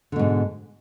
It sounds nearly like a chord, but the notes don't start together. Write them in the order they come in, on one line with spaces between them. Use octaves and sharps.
D3 B2 G#2